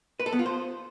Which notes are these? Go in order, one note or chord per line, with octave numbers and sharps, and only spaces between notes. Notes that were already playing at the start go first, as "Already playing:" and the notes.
B4
A4
B3
F4
C5